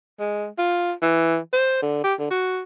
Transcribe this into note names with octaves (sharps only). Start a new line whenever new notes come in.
G#3
F4
E3
C5
D3
G4
D3
F#4